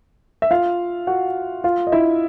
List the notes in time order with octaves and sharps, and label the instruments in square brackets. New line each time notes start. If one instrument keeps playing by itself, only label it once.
[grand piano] E5
F4 F5
F#4 F#5
F4 F5
D#5
E4 E5